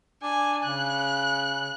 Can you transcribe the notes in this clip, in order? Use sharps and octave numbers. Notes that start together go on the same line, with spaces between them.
D4 G#5
C#3 F#6